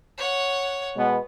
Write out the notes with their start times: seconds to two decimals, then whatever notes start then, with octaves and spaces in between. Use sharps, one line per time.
0.18 C#5 F#5
0.96 B2 G#3 B3